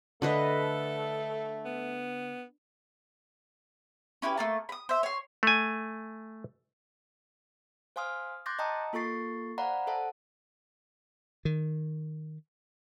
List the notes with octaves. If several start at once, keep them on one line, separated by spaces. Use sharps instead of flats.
D3 A3 A4 B4 D#5
B3
C#4 E4 G4 B4
A3 A#3 A5
B5 D#6
C5 E5
C#5 C6
A3 G#5
C5 F5 G#5 C6 D#6 F6
C6 D6 F#6 G6 A6 A#6
D#5 G5 A5 A#5 D#6
A#3 F4 A4 C#6 A6 C7
C5 D5 F5 F#5 A#5 B5
A4 C5 E5 F#5 A5
D#3